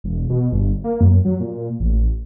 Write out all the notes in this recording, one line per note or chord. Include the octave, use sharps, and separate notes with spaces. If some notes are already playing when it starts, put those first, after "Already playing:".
E1
B2
G1
A#3
F#2
F#3
A#2
A1